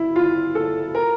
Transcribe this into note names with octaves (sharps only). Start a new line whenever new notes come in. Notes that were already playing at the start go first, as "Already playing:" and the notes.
Already playing: E4
F4
A4
A#4